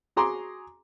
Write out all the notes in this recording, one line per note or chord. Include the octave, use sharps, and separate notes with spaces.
F#4 G#4 A#5 C6 D6